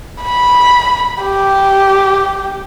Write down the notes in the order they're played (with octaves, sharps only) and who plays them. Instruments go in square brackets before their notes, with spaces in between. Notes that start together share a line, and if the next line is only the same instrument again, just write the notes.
[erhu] B5
G4